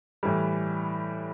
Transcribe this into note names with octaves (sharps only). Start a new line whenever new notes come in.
A2 E3 G3